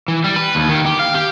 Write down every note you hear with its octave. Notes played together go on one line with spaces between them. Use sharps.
E3
G3
B4
D#2
D#3
G4
F5
G4